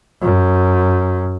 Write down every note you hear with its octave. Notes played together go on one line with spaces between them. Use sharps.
F#2